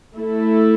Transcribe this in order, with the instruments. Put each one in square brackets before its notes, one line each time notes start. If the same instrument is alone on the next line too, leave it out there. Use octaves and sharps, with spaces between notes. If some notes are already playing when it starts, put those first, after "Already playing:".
[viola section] A3 E4 A4